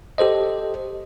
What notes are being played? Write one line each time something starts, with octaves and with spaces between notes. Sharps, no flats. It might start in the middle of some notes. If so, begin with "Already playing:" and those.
G4 A4 C5 D#5